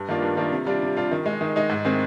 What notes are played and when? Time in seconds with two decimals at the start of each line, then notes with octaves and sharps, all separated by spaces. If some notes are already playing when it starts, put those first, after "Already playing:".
Already playing: G2
0.09 D#3 A#3 D4 F4
0.22 G2
0.37 D#3 A#3 D4 F4
0.52 C3
0.67 G3 D4 F4
0.82 C3
0.97 G3 D4 F4
1.11 D#3
1.26 G#3 D#4
1.41 D#3
1.56 G#3 D#4
1.69 G#2
1.85 D#3 G#3 C4